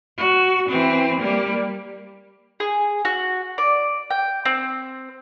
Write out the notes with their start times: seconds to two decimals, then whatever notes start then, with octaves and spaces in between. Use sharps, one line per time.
0.17 F#4
0.69 E3 C4
1.20 G3 A#3
2.60 G#4
3.05 F#4
3.58 D5
4.10 G5
4.45 C4